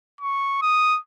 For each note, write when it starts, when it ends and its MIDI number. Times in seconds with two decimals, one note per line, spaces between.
0.21 0.58 85
0.62 0.99 87